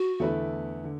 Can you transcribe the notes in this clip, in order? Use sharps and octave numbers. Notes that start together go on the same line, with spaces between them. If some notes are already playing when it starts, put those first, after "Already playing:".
Already playing: F#4
E2 D3 A3 E4 B4
D3